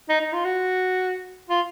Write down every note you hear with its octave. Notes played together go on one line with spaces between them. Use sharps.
D#4
D#4
F4
F#4
F4